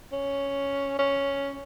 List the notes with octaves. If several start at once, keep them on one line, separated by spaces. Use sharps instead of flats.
C#4
C#4